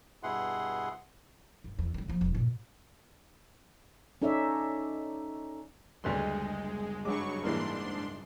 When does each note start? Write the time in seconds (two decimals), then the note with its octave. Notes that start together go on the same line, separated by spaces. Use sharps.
0.23 G2 B2 E4 G#4 F#5 C6
1.64 G1
1.78 E2
1.94 C#3 G3
2.08 F3 A#3
2.21 E1
2.35 G2 A#2
4.22 C#4 D#4 A4 C#5 D5 E5
6.04 F#1 D2 G3 G#3 B4 C6
7.05 G2 F#3 G#3 C#6 D6
7.43 G#2 E3 A#3 D4 C6